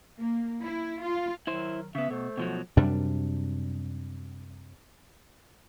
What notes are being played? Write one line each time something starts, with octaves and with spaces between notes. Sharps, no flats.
A#3
E4
F4
D#3 F#3 E4 C5
C#3 B3 E5
B2 A3 A4 C5
B2 F3 F#3
F#2 C3 G3 D4